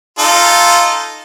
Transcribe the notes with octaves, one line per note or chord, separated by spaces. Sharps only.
D#4 F4 A4